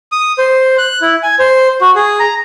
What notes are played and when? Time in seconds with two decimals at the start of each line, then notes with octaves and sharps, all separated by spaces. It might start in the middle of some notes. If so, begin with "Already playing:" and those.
0.12 D#6
0.38 C5
0.78 F#6
1.01 E4
1.23 G#5
1.39 C5
1.81 F#4
1.95 G#4
2.20 A#5